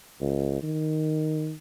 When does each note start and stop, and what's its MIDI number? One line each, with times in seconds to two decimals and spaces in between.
0.21 0.62 37
0.63 1.54 51